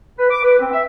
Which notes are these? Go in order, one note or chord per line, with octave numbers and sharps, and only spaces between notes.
B4
D6
B4
C4
E5